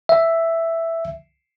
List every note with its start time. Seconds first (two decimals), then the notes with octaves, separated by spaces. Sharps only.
0.09 E5